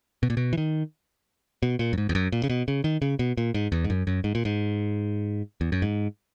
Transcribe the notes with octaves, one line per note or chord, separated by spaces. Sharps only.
B2
A#2
B2
E3
D#3
B2
A#2
F#2
G#2
E2
F#2
A#2
C#3
B2
C#3
D#3
C#3
B2
A#2
G#2
E2
G#2
F#2
F#2
G#2
A#2
G#2
E2
F#2
G#2